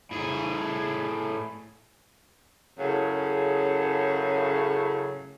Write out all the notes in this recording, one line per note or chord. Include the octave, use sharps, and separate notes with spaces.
A2 G#4
F#2 A2 C#3